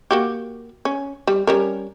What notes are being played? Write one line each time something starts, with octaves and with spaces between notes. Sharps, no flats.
A#3 F#4 G4
C#4
G3
G3 C#4 A#4